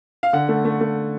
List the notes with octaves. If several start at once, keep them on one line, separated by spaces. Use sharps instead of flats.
F5
D3 F#5
A3
A3
A3